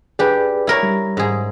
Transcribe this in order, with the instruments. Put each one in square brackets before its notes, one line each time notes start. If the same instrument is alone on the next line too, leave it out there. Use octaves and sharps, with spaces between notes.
[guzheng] D4 G4 [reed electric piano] G#4 B4
[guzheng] E4 A#4 C#5
[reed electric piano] G3
[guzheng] G#2 G#4